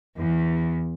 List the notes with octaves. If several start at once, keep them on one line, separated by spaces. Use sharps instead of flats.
E2